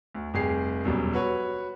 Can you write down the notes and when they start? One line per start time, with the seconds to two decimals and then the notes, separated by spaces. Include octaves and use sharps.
0.15 D2
0.34 F1 G3 G4 G#4 C7
0.85 E1 F#2 G3
1.13 F#4 B4 C#5